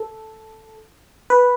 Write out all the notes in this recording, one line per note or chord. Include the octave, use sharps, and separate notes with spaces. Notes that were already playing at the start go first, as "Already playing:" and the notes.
Already playing: A4
B4